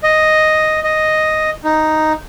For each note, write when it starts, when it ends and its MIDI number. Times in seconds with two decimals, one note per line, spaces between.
0.03 0.80 75
0.84 1.50 75
1.64 2.13 63